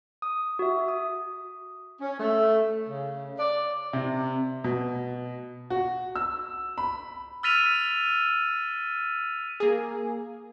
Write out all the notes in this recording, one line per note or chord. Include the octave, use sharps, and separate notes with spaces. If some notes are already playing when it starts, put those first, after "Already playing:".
D#6
F#4 E5
D#6
C#4
A3
C#3
D5
C3
B2
F#4
E6
B5
E6 F6 A6 B6 D#7 F7
A#3 G#4